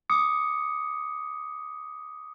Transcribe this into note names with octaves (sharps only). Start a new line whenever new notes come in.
D6 D#6 C#7